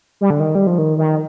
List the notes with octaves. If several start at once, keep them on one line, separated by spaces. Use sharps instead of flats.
G3
D3
D#3
G3
F3
D#3
D#3